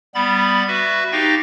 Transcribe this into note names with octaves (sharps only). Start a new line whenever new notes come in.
G3 B3 B5 A6
F#4 B4 E5
D#4 G4 F5 G5 A6 A#6